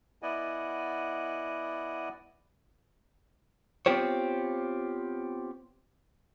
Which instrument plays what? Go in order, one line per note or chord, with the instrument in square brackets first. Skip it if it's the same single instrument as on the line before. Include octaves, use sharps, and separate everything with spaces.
[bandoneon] B3 E4 D5 D#5 F#5 G#5
[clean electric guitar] B3 C4 F4 G4 C5 C#5